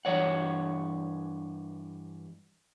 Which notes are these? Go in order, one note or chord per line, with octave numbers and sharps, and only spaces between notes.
G2 E3 C#5 F#5